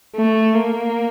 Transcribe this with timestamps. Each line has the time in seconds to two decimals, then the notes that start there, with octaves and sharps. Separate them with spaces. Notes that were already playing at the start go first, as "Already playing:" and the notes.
0.16 A3
0.55 A#3